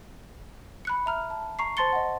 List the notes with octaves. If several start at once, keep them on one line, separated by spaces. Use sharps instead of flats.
B5 F#6 C#7
E5 A#5 F6
A5
A#5 C#6 C7
C5 A5 C6 A6 C#7 G7
D#5 F#5